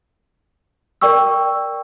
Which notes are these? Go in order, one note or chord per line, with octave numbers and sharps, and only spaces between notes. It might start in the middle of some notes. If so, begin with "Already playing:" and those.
A#4 D5 G5 C#6 E6